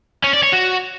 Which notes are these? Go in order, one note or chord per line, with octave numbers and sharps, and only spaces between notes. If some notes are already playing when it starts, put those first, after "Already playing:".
C#4
D5
C#5
F#4